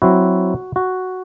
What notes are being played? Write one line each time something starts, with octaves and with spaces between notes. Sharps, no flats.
F#3 C4 E4 F#4
F#4